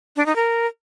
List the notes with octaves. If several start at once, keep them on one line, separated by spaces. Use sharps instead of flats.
D4
D#4
A#4